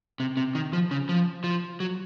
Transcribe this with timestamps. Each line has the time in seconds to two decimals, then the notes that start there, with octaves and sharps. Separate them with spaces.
0.20 C3
0.37 C3
0.55 D#3
0.73 F3
0.91 C#3
1.09 F3
1.44 F3
1.80 F#3